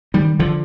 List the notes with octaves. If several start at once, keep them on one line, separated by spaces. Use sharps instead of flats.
D#3 G3
D3 F3